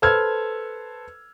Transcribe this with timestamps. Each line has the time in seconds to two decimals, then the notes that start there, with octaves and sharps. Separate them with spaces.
0.02 A4 B4 C5 E6 F6 G#6